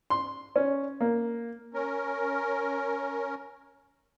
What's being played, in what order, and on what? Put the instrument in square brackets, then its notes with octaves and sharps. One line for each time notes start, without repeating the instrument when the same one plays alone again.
[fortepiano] C6
C#4
A#3
[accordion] C#4 A#4